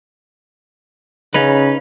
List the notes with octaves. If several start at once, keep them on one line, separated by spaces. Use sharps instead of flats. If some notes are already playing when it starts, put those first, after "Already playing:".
C#3 C#4 D#4 B4